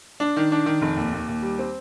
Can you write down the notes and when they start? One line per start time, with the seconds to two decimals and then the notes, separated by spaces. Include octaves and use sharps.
0.20 D4
0.37 D#3
0.52 D4
0.66 D#3
0.82 F1
0.97 D#2
1.12 D#2
1.28 D#2
1.43 G3
1.59 C4